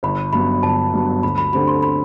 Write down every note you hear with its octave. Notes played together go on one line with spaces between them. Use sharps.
G1 B5
G2 F#3 B3 B5
G1 A5
G2 F#3 B3
D2 B5
B5
D3 A3 C4 G4 B5
C6
B5